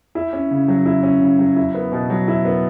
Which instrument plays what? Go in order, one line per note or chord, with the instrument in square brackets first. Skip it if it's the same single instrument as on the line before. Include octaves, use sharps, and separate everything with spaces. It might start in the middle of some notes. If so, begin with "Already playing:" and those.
[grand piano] E4
C#4
C#3
F#3
E4
C#4
C#3
F#3
E4
B3
B2
F#3
E4
B3